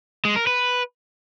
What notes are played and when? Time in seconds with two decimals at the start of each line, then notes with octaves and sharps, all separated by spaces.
0.25 G#3
0.36 A#4
0.47 B4